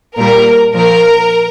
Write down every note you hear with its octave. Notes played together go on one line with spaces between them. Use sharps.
A#2 G3 A#4
A#2 F3 A#4